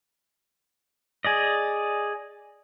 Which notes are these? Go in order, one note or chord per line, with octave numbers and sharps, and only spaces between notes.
G#4 D5 D#5